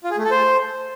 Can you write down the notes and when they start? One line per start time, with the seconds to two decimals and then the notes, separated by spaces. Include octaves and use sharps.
0.04 F4
0.11 G#4
0.17 A3
0.24 A4
0.31 C5